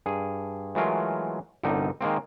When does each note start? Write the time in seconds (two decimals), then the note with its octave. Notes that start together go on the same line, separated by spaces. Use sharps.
0.06 G2 G#4
0.75 E3 F#3 G#3 A3 F4 A#4
1.63 G1 C2 D3 G3 D#4
2.01 D#3 G#3 A#3 C4